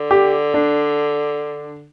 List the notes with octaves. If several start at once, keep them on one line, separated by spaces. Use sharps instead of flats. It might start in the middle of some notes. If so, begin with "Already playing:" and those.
Already playing: D3
G4
D4